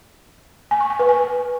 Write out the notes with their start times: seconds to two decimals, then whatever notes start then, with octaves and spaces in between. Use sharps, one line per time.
0.71 G#5
0.81 C#6
0.90 G#5
0.99 B4
1.09 G#5